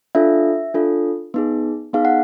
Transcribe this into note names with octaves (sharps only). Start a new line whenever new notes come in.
D4 F4 A4 E5
D4 F4 A4
B3 D#4 G#4
B3 D#4 G#4 F5
F#5